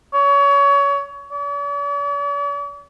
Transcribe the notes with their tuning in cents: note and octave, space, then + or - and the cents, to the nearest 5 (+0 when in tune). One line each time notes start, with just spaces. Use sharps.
C#5 +30
D5 -45